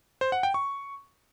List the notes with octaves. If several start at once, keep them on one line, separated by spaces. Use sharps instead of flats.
C5
F#5
G5
C#6